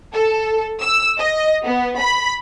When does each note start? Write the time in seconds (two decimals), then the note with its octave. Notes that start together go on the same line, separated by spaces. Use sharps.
0.13 A4
0.80 E6
1.18 D#5
1.63 B3
2.00 B5